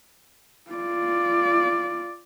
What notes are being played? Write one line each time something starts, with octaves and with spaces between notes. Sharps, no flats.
F4 D5